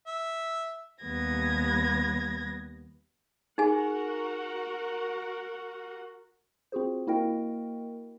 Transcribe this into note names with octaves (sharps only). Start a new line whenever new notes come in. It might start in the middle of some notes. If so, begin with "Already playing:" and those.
E5
D#2 G3 B3 G#6 A#6
D#4 F#4 G#4 A#4 F#5 G#5
C4 F4 F#4 G#4 C5
A#3 E4 F#4 A#4 D#5 G5